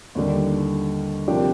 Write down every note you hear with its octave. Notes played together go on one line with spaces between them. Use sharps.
D#2 D3 G3
C3 F3 A#3 D4 G4